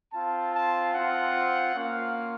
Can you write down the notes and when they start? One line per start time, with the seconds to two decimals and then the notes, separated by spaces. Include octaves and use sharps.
0.13 C4 F4 A5
0.54 A5
0.94 C4 F4 F#5
1.75 A#3 C#4 F4 F5